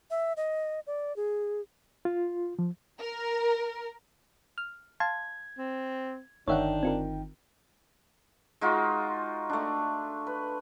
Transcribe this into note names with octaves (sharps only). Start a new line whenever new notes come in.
E5
D#5
D5
G#4
F4
F3
A#4
F6
F5 A5 C6 G#6
C4
G1 D#3 D4 C#5 E5 F#5 G5
C4 F4 A#4
G#3 D#4 F4 F#4
A3 D4
B4